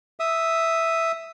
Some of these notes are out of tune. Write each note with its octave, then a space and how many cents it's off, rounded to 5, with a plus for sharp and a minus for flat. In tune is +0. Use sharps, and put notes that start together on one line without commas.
E5 +0 D#6 +0